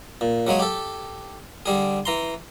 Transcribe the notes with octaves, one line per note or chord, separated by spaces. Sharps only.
A#2
C#3 F#3 G#3 C#5
G4 A4
D3 G3 G#4
E3 A#5 C6